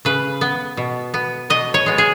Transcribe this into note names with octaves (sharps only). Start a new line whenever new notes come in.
C#3 B4
B3
B2
B3
B2 D#5
C#5
G#3 B3
G#4